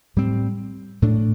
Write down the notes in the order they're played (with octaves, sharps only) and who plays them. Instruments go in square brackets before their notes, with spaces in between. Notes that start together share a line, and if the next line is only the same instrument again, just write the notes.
[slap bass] A2 G3 C4
A2 A3 D4